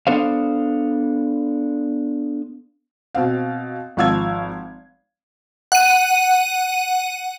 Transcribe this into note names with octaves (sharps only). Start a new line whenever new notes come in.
B3 D4 A4 C5 F5
B2 C4 F5
G#1 F3 F5 E6 G#6
F#5 D#7